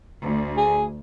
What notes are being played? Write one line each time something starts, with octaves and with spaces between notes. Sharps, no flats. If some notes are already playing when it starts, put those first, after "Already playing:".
D2
G#4